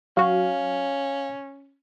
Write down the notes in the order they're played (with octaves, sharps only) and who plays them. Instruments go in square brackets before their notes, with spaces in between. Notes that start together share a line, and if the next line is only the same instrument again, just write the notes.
[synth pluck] F#3 F#4 [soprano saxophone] C#4 [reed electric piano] F5